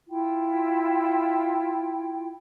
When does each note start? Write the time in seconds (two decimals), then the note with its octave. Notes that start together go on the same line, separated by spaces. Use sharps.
0.09 E4 F4 G5